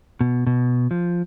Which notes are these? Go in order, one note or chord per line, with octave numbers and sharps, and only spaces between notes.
B2
B2
F3